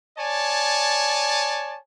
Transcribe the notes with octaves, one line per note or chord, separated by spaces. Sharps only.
C#5 D5 G#5 A5